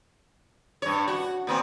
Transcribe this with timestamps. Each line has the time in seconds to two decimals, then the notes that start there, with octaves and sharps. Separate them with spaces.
0.82 G2 C#5
1.08 F#4
1.47 A#2 B3 C4